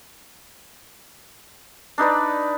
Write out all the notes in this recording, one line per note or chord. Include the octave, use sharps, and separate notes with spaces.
D4 D#4 B4 D5